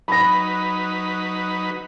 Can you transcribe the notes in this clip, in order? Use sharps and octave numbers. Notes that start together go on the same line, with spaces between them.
F#3 D#4 B4 B5 A#6